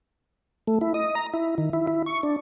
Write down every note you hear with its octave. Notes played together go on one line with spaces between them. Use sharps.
A3
E4
D#5
A#5
E4
D#3
E4
E4
C#6
D4